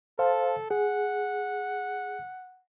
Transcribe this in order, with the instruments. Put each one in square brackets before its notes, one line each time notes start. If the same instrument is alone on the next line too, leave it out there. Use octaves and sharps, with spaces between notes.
[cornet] A4 [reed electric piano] C5 F5 A5
[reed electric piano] G#4 [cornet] F#5